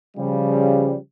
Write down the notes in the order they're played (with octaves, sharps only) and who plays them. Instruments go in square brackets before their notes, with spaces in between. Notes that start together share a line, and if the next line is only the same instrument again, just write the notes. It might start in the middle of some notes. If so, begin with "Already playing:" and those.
[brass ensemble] C#3 F3 G3